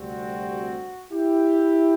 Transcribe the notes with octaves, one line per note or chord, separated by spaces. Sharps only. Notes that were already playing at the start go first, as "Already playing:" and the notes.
Already playing: D2 C3 G3 C4 F#4
E4 G4